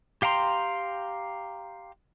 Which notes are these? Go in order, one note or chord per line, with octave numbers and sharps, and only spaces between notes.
G4 F5 G5 A#5 C6